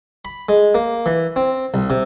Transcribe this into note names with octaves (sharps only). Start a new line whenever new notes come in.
B5
G#3
A#3
E3
C4
C2
C3